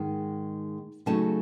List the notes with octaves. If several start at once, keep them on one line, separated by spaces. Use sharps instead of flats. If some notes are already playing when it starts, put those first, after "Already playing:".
Already playing: G#2 D#3 G#3
C#3 F#3 A3 D#4 A5